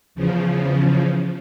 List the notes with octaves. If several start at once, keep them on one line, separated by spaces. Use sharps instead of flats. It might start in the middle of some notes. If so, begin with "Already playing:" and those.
E2 C#3 F3